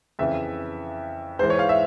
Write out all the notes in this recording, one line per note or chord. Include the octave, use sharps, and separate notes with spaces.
F2 C#3 E3 E5
G#2 E3 C5
C#5
F5
E5